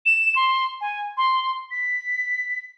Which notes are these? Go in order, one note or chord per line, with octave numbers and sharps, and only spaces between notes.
E7
C6
G#5
C6
B6